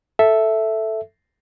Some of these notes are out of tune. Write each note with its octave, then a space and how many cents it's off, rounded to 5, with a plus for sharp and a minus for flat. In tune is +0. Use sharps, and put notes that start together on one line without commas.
A4 +0 E5 +0